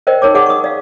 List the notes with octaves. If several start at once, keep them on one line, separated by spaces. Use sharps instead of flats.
A#4 C5 D5 D#5 G5
D#4 A#4 C#5 D6
G#4 D5 F#5 D6
C#6 D#6
D5 F5